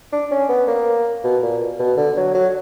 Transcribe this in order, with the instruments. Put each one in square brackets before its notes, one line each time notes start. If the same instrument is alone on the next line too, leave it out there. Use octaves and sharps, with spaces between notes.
[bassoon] D4
C#4
B3
A#3
B2
A#2
B2
D3
F#3
F#3